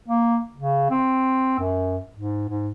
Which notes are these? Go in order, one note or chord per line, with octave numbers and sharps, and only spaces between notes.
A#3
C#3
C4
F#2
G#2
G#2